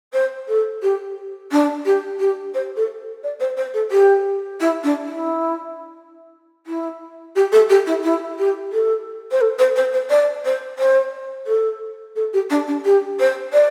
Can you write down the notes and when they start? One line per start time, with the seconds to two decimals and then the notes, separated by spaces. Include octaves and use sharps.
0.13 C5
0.48 A4
0.82 G4
1.51 D4
1.85 G4
2.19 G4
2.54 C5
2.76 A4
3.23 D5
3.40 C5
3.57 C5
3.74 A4
3.91 G4
4.60 E4
4.83 D4
5.05 E4
6.66 E4
7.35 G4
7.52 A4
7.69 G4
7.86 E4
8.03 E4
8.38 G4
8.72 A4
9.31 C5
9.41 A4
9.58 C5
9.76 C5
9.93 C5
10.09 D5
10.45 C5
10.78 C5
11.46 A4
12.15 A4
12.33 G4
12.50 D4
12.67 D4
12.85 G4
13.19 C5
13.53 D5